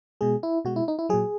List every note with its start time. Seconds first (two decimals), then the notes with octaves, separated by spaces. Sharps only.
0.21 B2 G#3 G#4
0.43 E4
0.65 B2 G#3 F#4
0.76 E4
0.88 D#4
0.99 E4
1.09 A#2 F#3 G#4